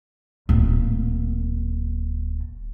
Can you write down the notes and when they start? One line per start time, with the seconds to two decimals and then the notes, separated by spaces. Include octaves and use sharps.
0.49 D1 A#2